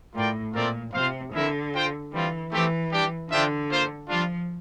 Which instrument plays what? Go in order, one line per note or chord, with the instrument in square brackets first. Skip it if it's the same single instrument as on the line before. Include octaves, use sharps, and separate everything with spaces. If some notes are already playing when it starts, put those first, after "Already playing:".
[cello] A2 [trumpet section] F4 A#4 D5 G5
[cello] A#2 [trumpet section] A3 C4 F4 A#4 D5
[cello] C3 [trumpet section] F4 C5 F5
[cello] D3 [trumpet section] C4 E4 A#4 E5
[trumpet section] F4 C5 G5
[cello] E3 [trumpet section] G3 C4 F4
[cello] E3 [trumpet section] A3 C4 G4
[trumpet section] G3 D4 G4
[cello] D3 [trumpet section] D4 F4 C5 E5 G5
[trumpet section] A#3 F4 C5
[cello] F3 [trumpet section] G3 D4 F4